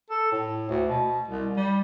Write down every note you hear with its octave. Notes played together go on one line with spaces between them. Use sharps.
A4
A2
D2
B2
C2
G3